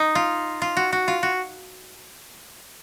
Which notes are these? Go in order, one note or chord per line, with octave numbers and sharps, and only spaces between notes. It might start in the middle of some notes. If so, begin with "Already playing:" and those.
Already playing: D#4
F4
F4
F#4
F#4
F4
F#4